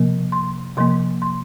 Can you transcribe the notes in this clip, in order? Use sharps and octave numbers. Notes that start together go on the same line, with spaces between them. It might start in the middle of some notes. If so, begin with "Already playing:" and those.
Already playing: C3 F3 A#3
C6
C3 F3 A#3 C6
C6